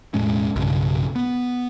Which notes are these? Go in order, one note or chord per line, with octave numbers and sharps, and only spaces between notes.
E1 A2 G#3 C#4
B1 G2 C#3
B3